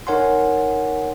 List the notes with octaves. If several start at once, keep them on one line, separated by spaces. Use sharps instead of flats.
D#4 A#4 C#5 F#5 G#5 C6